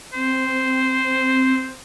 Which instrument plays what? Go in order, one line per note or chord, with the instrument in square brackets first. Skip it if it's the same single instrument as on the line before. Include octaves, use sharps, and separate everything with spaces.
[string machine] C4 [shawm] C5